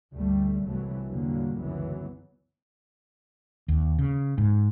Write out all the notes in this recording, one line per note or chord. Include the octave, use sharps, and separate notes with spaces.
G1 D2 D3 G3 A3
C2 E3 F#3 A3
E2 A#2 D3 F#3 G3 A#3
G1 C#2 F#2 E3 F#3 B3
D#2
C#3
G#2